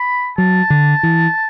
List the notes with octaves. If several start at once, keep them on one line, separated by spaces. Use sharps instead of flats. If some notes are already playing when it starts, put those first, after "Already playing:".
Already playing: B5
F#3 A5
D3
E3